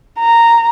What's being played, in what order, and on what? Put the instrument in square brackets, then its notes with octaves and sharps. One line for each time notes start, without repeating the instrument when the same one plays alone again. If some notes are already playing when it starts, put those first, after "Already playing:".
[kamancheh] A#5